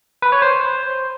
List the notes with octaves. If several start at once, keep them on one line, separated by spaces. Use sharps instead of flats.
B4
C#5
C5